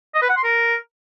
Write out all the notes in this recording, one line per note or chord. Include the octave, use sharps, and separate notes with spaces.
D#5
B4
F#5
C6
A#4